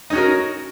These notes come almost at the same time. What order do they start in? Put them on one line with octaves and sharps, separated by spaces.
D#4 C#4 F#4 A#4